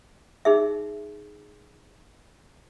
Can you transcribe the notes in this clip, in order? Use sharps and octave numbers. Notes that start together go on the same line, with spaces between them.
D#4 G#4 E5